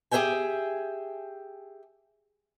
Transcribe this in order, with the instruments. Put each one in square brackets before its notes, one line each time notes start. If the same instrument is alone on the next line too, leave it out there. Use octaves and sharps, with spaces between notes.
[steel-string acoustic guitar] G4 G#4 C5 E5 G5 G#5